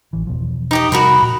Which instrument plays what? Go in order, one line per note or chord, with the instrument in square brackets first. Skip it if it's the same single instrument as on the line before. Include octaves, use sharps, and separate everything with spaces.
[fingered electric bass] A1 E3
E2 B2 F3
[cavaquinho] D#4 G4 D#5
[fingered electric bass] C3 F3 G3 [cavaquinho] F#4 A#4 B5
[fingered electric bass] A#2